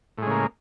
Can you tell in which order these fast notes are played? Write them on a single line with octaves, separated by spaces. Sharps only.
A2 G#3 C#3 A#3